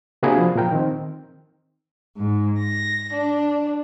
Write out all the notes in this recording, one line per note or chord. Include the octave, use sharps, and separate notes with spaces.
C3 A#3 D4 F#4 G#4 B5
F3
A#2 F3 A#4 G5
D#3 C4
G#2
A#6
D4